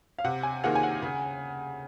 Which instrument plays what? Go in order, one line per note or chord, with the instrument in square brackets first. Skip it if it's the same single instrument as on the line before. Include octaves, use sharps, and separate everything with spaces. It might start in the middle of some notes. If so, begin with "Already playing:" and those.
[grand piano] F5
[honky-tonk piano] C3 [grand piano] F#5
[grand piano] G#5
[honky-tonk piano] D#3 A#3 F4 G#4 [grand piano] F#5
[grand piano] G#5
F#5
[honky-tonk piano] C#3